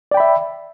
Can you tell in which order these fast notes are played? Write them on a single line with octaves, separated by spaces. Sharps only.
D5 G5 B5 E5